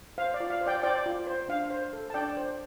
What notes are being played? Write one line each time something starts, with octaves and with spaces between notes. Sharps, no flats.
C5 F5
D5
F4
F5
C5
D5 G5
C5 D5 G5
F4
C5
D4 F5
C5
A4
A5
D4 D5 G5
C5